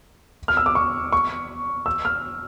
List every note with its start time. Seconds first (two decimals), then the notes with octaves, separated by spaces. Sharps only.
0.48 F6
0.57 E6
0.66 D6
0.75 C#6
1.12 C#6
1.86 E6
2.05 F6